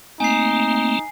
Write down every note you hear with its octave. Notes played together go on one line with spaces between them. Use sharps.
A3 A#3 C4 D#4 G#5 C7